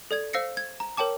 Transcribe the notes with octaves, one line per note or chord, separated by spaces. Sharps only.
A4 D5 G#6
C5 F5 E6 A#6 C7 C#7
G#6
A#5
A#4 C#5 G5 A5 D6